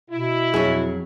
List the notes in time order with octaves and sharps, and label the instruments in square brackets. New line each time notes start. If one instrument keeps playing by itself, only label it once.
[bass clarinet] B2 [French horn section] E4
[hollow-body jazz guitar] F2 F#3 [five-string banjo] G#4